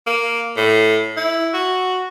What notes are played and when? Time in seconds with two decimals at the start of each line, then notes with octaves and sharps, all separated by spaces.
0.07 A#3
0.57 A2
1.17 E4
1.53 F#4